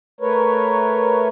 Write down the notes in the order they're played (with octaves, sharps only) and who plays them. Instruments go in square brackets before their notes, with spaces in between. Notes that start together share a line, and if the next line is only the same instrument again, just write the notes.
[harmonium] A3 A#4 B4 C#5